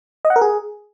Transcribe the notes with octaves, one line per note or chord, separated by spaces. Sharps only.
D#5
F#5
A#4
G#4